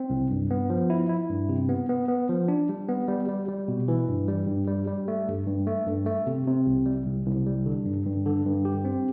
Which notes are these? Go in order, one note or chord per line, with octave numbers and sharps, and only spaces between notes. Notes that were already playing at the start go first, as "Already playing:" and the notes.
Already playing: C4
C2
G2
B3
F3
E4
E4
G2
C3
B3
B3
B3
F3
D4
G3
B3
G3
G3
G3
B2
E3
G2
G3
G2
G3
G3
A3
G2
G2
A3
G2
A3
C3
C3
C2
G3
C2
C2
G3
D3
G2
G2
D3
G2
G4
C4